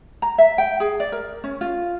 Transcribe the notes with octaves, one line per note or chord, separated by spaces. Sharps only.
A#5
E5
G5
G#4
D5
A#4
C#4
F4